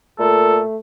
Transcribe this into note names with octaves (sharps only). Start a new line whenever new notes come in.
A#2 A3 A4